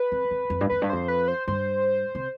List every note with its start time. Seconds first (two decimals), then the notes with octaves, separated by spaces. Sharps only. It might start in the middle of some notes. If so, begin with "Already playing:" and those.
Already playing: B4
0.12 F2
0.31 F2
0.50 F2
0.61 G2
0.69 F2 B4
0.82 G2
0.89 F2 C5
1.08 B4
1.28 C5
1.48 G2 C5
2.15 C3